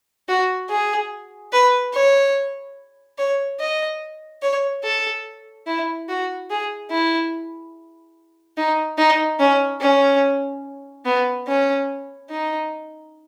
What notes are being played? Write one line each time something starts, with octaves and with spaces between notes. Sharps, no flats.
F#4
G#4
B4
C#5
C#5
D#5
C#5
A4
E4
F#4
G#4
E4
D#4
D#4
C#4
C#4
B3
C#4
D#4